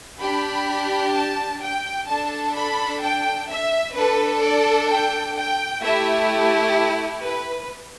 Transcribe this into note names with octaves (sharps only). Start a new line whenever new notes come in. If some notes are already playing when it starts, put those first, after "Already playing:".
D4 G4 B5
A5
G5
D4 A4 A5
B5
G5
E5
D4 A4 B4
D5
G5
G5
A3 E4 G4 E5
B4